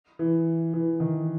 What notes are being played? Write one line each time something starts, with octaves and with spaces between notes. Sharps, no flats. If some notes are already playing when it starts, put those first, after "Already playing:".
E3
E3
D#3